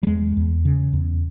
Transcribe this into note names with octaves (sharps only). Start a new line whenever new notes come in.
G3
E2 G#3
E2
C#3
E2